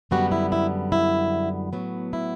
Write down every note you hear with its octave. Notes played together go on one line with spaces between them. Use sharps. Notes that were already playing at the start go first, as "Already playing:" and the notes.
F#2 D3 G3 B3 F#4
E4
E4
E4
A2 F#3 B3
E4